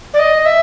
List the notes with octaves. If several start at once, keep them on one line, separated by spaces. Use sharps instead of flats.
D5
D#5
E5